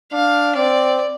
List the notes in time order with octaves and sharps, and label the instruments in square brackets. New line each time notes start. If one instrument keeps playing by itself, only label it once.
[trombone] D4 [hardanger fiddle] F5
[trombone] C4 [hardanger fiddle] D5